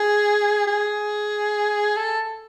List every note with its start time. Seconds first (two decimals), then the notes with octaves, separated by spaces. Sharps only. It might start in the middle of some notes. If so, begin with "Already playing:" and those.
Already playing: G#4
0.67 G#4
1.97 A4